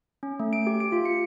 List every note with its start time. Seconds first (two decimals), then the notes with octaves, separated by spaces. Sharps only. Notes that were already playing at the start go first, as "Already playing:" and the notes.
0.23 C#4
0.40 A3
0.53 D7
0.67 G4
0.80 D7
0.92 F4
1.05 C#7